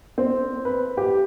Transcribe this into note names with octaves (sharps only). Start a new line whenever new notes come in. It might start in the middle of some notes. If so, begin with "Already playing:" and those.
C4
B4
G4